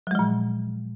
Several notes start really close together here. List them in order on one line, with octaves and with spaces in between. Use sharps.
F#3 G#3 F3 A#2